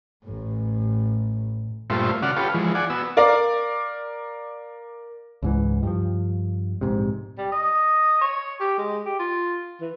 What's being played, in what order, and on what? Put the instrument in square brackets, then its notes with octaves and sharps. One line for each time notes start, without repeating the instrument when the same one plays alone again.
[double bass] A1 A2
[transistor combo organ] G2 A#2 A3 F4 C5 E5
C#3 F#4 D5 F#5 F6
F4 G4 A4 B4 C#5 F5
E3 F3 G#3
D5 F#5 G#5
B3 F#4 E6
[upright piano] A#4 D5 F5
[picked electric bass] C#2 G#2 E3
G2 F3
A#1 G#2 C3
[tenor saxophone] G3
D#5
C#5
G4
G#3
G4
F4
E3